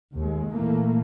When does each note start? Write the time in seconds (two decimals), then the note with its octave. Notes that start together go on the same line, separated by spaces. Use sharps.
0.15 D#2 G#3
0.50 A#2 E3 A3 A#3